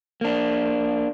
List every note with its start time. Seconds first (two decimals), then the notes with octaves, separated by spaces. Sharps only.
0.21 A#3 D4